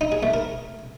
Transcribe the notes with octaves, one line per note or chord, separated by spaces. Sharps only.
D#4
G#4
A3
A#4